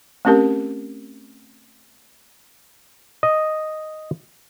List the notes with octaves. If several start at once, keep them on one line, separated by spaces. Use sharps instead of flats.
A3 C4 C#4 G4 A#4
D#5